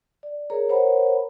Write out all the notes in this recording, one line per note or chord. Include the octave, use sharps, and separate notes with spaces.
D5
G#4 A#4 C#5 A#5
A#4 C5 C#5 F#5 A#5 B5